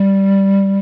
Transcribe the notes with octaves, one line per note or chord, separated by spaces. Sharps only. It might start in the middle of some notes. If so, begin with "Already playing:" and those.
Already playing: G3